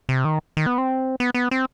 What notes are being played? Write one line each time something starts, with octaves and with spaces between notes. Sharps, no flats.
C3
D#3
D#3
B3
C4
B3
B3
C4